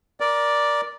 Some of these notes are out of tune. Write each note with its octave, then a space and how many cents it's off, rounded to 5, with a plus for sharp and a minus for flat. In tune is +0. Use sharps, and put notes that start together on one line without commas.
A#4 +15 D5 +0